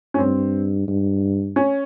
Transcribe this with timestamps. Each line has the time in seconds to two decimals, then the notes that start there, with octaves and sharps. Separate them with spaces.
0.14 C#4
0.18 G2 C4
0.88 G2
1.56 C#4